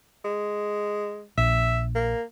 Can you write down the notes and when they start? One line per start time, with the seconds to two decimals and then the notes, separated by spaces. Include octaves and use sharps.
0.25 G#3
1.38 A#1 E5
1.95 A#3